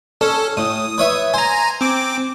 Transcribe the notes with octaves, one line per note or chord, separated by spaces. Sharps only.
C#4 A4
A2 D#6
B4 C#5 E5
C5 G#5 A#5
C4 D6